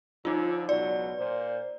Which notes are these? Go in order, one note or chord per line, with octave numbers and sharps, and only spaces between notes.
D3 F3 D#4 F4
C#2 B2 F#3 D5
A#2 C5